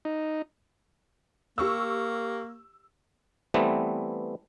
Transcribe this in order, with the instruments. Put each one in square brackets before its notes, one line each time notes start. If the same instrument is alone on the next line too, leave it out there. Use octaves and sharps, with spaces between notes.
[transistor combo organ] D#4
[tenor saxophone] A#3 [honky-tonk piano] G4 C#6 E6
[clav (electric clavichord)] E3 G3 A3 B3 C4